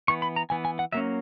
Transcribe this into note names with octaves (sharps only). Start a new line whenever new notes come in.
E3 B3 C#6
B5
A#5
E3 B3 G#5
G#5
F#5
F#3 A#3 C#4 E5